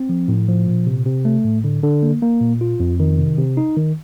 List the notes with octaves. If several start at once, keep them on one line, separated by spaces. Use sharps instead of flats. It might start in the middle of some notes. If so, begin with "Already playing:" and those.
Already playing: C4
F3
A2
F3
A#2
C3
C3
A3
A2
D3
D3
A#3
A#3
A#2
F4
F2
D#3
C3
C3
D#4
D#3